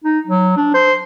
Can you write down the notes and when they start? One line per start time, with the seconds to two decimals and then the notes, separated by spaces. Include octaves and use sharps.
0.04 D#4
0.27 F#3
0.57 D4
0.74 C5